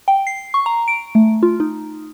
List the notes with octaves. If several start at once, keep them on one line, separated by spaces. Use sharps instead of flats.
G5
C7
C#6
A#5
D7
A3
F4
D#4